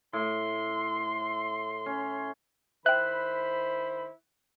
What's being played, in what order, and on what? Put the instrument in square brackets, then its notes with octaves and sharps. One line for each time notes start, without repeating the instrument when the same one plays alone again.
[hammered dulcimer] A2 [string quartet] C6
[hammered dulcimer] C#4
[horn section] D#3 E4 B5 [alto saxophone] C5 [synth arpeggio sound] E5 G5 [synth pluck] F#6